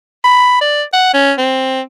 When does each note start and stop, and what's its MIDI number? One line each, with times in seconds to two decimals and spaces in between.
0.24 0.56 83
0.61 0.83 74
0.93 1.12 78
1.14 1.32 61
1.38 1.81 60